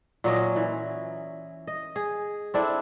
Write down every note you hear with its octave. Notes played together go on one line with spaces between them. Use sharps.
A#2 F#3 C#4 D#5
E3
D#5
G#4
C4 D4 E4 A4